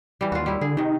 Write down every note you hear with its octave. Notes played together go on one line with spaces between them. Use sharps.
E3 G3
D#2 F4 F#4
G3 E4
D3 G#4
C3 D#3 D#4